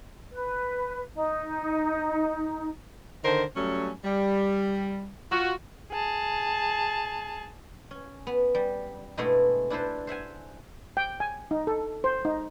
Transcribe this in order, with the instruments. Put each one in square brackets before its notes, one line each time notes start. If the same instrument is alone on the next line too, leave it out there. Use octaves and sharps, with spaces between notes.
[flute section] B4
D#4
[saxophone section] D3 D#3 A#4 C5
F#3 G3 A3 C#4
G3
F4 F#4
[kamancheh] G#4 A5
[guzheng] C#4
B3
G3
G2 B2 G#3 A3 B3 E4
D4 E4 A4 B4 C5
C5 E5 F#5 G#5
[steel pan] G5
G#5
D#4
A4
C5
D#4